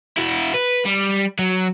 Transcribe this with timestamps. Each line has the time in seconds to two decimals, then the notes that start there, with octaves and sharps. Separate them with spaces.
0.17 E4 F#4
0.54 B4
0.86 G3
1.39 F#3